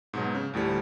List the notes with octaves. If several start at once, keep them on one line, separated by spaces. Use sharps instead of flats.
G#2 B2 F#3
C#3
D2 A2 F3 G3